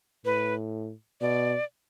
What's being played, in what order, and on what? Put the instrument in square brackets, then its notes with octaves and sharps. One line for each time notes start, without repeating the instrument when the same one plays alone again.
[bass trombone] A2 [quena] B4
[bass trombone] B2 [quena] D5